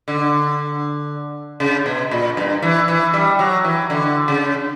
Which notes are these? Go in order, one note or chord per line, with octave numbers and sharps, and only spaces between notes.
D3
C#3
B2
A#2
G2
E3
E3
G3
F#3
E3
D3
C#3